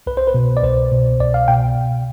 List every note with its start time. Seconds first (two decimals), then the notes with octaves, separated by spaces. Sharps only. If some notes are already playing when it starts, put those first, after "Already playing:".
0.07 C2 B4
0.17 C5
0.27 B4
0.34 B2
0.57 D5
0.63 C2 C5
0.91 B2
1.20 C2 D5
1.34 F5
1.48 B2 G5